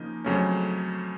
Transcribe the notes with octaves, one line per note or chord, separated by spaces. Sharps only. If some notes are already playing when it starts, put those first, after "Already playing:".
Already playing: C#3 F3 A#3 D#4
F2 C#3 F#3 A3 C#4